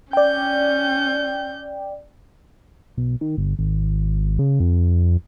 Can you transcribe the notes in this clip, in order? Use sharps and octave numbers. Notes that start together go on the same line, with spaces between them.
C#4 D5 G5 G6
B1
D#3
G1
G#1
C#3
F2